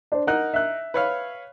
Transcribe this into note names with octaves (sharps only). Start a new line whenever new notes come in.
D4 C5
D#4 A#4 F#5 F#6
E5 F#6
B4 C#5 F5